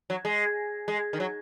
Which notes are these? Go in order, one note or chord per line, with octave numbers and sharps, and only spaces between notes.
F#3
G#3
G#3
D#3
F#3